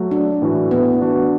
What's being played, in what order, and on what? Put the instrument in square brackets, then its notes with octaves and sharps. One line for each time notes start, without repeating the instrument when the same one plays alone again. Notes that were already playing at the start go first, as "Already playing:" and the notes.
Already playing: [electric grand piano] F#3 A3 F#4
[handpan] D4
[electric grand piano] A2 E3 A3 F#4
[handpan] B3
[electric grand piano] E3 D4 F#4